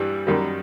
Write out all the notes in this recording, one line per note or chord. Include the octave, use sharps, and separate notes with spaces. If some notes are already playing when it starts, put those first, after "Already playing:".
Already playing: G2 E3 G3
F#2 D#3 G3